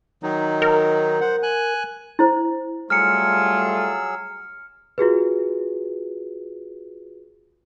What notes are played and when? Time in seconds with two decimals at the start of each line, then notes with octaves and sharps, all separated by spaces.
0.23 D#3 F#3 D#4
0.62 A#4
1.21 C5 F#5
1.43 G#5 F#6
2.19 E4 C5
2.90 F#3 G3 A3 F4 G#4 E6 F6 C#7
4.98 F4 F#4 G#4 B4